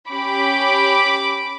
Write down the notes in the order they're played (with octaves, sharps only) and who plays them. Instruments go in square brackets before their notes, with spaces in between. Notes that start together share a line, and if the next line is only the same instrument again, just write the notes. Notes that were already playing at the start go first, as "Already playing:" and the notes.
[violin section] C#4 G4 B5 D6